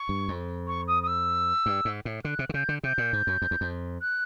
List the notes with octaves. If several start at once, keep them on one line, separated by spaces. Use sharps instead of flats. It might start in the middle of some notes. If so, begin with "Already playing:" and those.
Already playing: C#6
G2
F2
C#6
D#6
D#6
E6
G2
G#2
A2
D3 F#6
C3
D3
C#3 G6
D3
C3 G6
A#2
G#2
F#2
F2
E2
F2
F#6